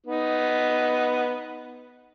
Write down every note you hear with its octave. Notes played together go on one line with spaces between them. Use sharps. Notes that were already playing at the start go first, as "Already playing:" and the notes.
B3 D#4